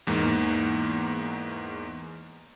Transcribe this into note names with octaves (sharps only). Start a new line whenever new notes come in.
E2 G#2 A#3